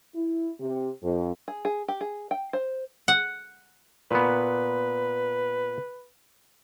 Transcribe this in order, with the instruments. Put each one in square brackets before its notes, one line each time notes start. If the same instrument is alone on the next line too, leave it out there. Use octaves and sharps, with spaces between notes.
[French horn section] E4
C3
F2
[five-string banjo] G#4
G#4
G4
G#4
G5
C5
[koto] F#5
[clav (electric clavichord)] A#2 B3 [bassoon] B4